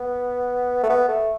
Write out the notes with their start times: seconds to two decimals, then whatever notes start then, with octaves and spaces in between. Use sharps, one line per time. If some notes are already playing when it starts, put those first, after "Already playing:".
Already playing: B3
0.83 A3
0.89 B3
1.09 A3